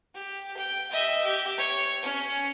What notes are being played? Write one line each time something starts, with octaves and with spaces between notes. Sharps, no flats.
G4
G5
D#5 E5
G4
C#5
C#4